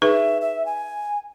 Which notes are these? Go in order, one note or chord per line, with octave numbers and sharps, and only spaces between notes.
D#4 G#4 B4 E5
E5
G#5